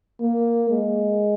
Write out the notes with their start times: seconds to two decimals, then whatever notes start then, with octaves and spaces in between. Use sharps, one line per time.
0.21 A#3
0.70 G#3